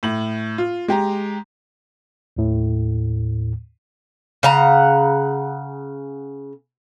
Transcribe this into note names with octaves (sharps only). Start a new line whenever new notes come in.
A2 F#7
F4
G#3 G4 A#5
D#2 A2
C#3 F#5 A#5